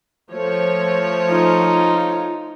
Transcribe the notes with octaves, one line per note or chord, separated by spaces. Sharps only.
F3 A3 C#5
D#4 F4